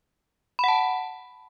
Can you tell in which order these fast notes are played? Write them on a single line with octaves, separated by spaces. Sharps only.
B5 F#5 A5